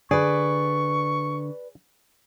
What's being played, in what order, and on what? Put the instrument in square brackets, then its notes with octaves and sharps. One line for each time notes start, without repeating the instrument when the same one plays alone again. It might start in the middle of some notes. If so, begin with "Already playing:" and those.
[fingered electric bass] D3 [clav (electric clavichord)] G#4 [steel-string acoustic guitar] B4 D5 [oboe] C#6